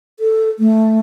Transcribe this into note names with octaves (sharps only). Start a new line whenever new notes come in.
A4
A3